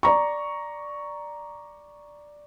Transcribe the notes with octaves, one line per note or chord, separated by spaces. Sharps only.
D5 A#5 C#6